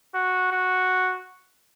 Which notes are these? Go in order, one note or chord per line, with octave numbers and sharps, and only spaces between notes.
F#4
F#4